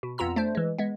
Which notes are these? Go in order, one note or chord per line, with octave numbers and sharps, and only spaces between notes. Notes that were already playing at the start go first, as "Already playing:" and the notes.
B2
F2 B3 F4 A#5 E6
A3 D4 C5
E3 G#3
G#3 B3